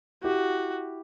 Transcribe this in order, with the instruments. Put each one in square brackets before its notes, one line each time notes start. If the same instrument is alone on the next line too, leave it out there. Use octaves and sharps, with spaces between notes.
[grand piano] E4 G4 [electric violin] F#4